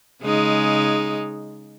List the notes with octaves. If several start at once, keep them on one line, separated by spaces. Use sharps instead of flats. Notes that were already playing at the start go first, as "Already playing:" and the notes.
C#3 G#3 D#4